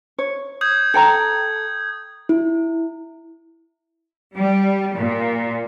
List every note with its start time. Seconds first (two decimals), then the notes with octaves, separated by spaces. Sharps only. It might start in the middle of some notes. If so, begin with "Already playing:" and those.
0.18 C#5
0.61 D#6 G6 G#6
0.94 A4 G5 A#5
2.29 E4
4.36 G3
4.97 A#2